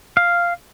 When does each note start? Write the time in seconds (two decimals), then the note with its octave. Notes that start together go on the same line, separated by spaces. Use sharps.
0.17 F5